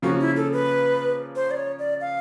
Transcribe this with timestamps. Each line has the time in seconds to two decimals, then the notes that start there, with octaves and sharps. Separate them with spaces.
0.02 C#3 F3 A#3 C#4 F4 F#4
0.20 E4
0.36 A4
0.53 B4
1.35 C5
1.51 D5
1.57 C#5
1.79 D5
2.01 F5